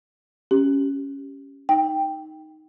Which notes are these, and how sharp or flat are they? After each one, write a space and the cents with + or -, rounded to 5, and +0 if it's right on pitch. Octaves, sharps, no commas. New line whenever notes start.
C#4 +0 G4 -5
D#4 +5 G5 +0